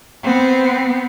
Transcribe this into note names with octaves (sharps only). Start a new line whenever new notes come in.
B3 C4